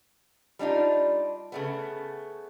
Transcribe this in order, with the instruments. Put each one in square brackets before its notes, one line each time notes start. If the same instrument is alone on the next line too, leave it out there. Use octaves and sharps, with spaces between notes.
[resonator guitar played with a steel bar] G3 D4 D#4 F4
C#3 A3 B3